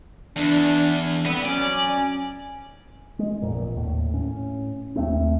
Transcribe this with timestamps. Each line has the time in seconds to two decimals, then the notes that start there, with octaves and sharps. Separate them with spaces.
0.36 E2 D4
1.26 D3 G3 B3 C4 B4
1.45 F#3 C#4 D5
3.19 G#3
3.42 A1 F2 A#2
3.76 D#2 A2
4.13 A2 C#4
4.95 D#2 A3 C4